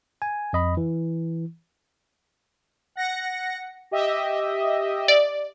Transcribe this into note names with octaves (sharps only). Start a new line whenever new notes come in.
G#5
F2 D#5 B5
E3
F#5 A#6 C#7
G4 D#5 E5
D5